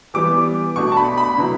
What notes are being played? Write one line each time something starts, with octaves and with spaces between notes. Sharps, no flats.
E3 G3 B3 D6
B2 A3 D4 C#6
A5
B5
B5
D3 F#3 B3 E4